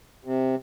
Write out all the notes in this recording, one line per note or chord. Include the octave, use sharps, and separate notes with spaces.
C3